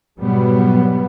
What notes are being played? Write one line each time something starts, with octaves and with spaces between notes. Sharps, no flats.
G#2 B2 F#3 G3 B3